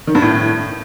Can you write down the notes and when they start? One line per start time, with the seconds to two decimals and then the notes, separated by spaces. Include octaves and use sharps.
0.07 D#3
0.15 G2
0.22 A2